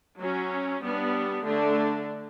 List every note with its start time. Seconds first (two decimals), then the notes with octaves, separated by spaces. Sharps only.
0.18 F#3 C#4
0.80 G3 B3 D4
1.43 D3 A3 D4